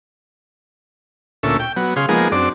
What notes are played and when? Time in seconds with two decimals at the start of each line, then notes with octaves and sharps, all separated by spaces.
1.43 D2 A#2 C#4 A4 E5
1.60 G5
1.77 F#3 B3
1.96 C#3 G#4 F5 C6
2.09 F3 G#3 A#3 B3 D#4 G#4
2.32 F#2 C4 D4 D5